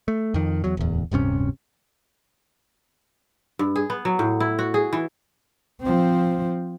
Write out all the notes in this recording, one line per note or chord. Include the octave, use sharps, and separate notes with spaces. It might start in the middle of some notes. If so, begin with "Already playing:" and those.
A3
F2 D#3
E2 F#3
D1 E2
D1 G2 C3 C#4
G2
G#4
B3
F#3
A2
E4
F#4
G#4
E3
F3 C4